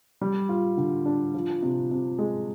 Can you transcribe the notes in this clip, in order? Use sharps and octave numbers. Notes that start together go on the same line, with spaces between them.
G3
F4
D3
D4
F3
C3
C3
G#3